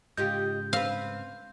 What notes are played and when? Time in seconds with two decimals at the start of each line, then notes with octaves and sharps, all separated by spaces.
0.17 G#2 C#3 D#4 F4 G4 G6
0.73 C4 B4 F5